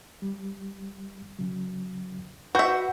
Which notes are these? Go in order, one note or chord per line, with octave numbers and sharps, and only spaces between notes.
G3
C#3 F#3
F#4 B4 E5 F#5 G6